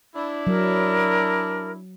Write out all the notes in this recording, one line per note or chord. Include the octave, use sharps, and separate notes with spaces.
D4 E4
F#3 A#4